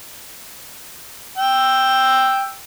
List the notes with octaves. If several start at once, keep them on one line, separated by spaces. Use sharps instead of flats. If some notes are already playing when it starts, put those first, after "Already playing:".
G5 E6